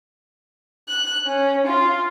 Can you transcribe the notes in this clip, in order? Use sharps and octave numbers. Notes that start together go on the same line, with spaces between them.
F#6
C#4
F4